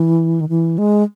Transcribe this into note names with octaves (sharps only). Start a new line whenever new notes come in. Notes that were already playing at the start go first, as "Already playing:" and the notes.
Already playing: E3
D#3
E3
G#3